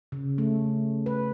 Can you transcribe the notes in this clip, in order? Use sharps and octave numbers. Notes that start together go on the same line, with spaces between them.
C#3
A3
B4